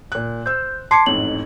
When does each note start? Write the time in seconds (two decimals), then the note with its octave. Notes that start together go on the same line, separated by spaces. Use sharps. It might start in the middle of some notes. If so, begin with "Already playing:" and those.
0.12 A#2 F#6
0.46 C5 E6 G6
0.91 A5 C6 D6 G#6 C7 C#7
1.06 A1 F2 G#2 F#7